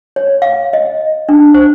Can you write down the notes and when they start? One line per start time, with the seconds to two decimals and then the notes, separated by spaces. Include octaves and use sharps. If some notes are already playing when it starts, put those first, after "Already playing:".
0.16 C#5
0.42 F5
0.73 D#5
1.29 D4
1.54 C5